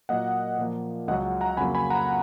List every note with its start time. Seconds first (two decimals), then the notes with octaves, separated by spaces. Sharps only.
0.09 A#2 F#3 A#3 D#5 F#5
0.58 A#2 F3 A#3
1.08 C#2 C#3 F#3 D#5 F#5
1.41 F#5 A#5
1.57 F2 C#3 F#3 A#3 G#5 B5
1.75 G#5 B5
1.90 F#5 A#5